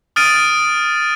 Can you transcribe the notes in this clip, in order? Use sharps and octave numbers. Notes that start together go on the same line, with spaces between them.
D#6 F6 A6 D7 D#7